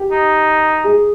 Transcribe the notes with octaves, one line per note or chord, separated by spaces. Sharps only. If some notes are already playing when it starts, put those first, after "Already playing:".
Already playing: G4
D#4
G#4